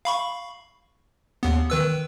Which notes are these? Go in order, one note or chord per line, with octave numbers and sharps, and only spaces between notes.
F5 B5 C#6
D#2 B3
D#3 B4 E6